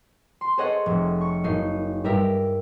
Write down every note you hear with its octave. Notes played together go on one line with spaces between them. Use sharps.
C6
G#4 A4 C5 C#5 D#5 F#5
F1
C#6
F#1 D#4 C7
G2 G4 A#4 E5 A#6 B6